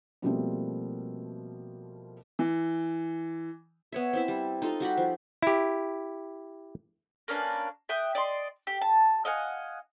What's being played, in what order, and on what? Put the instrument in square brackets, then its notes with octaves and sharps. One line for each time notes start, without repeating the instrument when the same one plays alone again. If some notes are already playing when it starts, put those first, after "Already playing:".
[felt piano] B2 F3 G3 A3 A#3 C4
[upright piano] E3
[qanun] B3 C#5 E5
C4 E4 E5
G3
D#4 F4 A4
G3 F#4 G4 B5
F3
[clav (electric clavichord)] E4 G4
[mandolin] A#3 C#4 D4 B4
E5 G5 D#6 F#6
D5 D#5 C6
G4
A5
D#5 F5 F#5 G#5